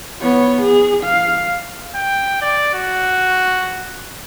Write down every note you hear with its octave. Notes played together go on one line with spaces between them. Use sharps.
B3 C#5
G#4
F5
G5
D5
F#4